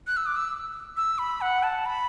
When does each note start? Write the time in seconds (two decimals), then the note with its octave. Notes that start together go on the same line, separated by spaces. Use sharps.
0.07 F#6
0.17 E6
0.26 D6
0.36 E6
0.97 E6
1.18 B5
1.41 F#5
1.63 A5
1.86 B5